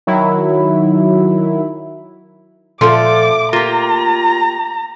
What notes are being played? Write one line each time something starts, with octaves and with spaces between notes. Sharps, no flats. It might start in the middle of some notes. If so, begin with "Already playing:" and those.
D#3 F#3 E4
A#2 F3 A3 F4 A4 D6
A#3 F4 G4 A#5